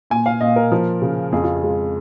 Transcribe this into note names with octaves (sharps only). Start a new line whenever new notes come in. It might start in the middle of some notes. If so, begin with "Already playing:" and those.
A#2 G#5
F5
A#2 D#5
A#4
F3
C#3
F2 G#4
F4
G#4
G#3